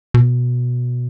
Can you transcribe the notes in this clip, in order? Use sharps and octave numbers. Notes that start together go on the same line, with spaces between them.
B2